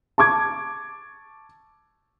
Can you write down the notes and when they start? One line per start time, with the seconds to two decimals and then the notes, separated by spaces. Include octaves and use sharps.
0.18 A5 C#6 D6 G#6